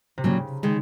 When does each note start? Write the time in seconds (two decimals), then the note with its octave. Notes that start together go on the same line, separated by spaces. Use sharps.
0.18 C3
0.24 A#2 C#3 F#3 A#3 C#4
0.63 D#3 G#3